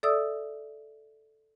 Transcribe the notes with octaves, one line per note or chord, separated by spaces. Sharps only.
A4 D5 E5 D#6 E6